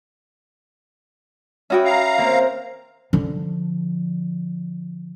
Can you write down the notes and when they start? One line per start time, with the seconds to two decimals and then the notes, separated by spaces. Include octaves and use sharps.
1.70 C#4 F#4 E5 G5 B5 D#6
1.85 F5 A#5
2.18 A#3 C4
3.13 D3 F3